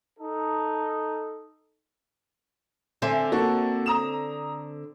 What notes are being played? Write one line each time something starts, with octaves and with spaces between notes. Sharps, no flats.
D#4 A4
D3 C4 E5 G#5
A#3 F#4 A4
A#5 D#6 E7